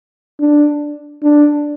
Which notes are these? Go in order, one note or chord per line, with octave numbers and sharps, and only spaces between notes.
D4
D4